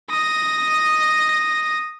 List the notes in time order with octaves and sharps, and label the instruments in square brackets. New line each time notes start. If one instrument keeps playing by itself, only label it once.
[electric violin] D#6 A#6